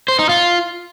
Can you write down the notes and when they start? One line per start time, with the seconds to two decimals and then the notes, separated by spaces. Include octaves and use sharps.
0.08 C5
0.19 D#4
0.29 F4